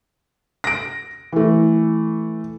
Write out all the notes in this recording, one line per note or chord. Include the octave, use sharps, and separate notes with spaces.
A#6 D7
E3 A3